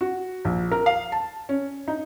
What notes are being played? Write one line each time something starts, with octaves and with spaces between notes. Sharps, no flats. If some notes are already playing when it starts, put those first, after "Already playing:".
F#4
A#1
A#4
F5
A5
C#4
D#4